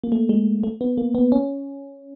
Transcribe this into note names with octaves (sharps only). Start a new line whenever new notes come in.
A#3
A3
G#3
A3
B3
A#3
B3
C#4